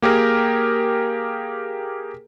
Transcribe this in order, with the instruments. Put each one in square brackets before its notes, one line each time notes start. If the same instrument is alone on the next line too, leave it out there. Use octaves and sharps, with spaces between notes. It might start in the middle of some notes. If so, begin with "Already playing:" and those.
[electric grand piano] A#3 G4 G#4 A#4